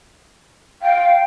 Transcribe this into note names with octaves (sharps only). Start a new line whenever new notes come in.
F5 G5